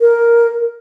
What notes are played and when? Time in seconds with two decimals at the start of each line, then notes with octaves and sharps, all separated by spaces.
0.01 A#4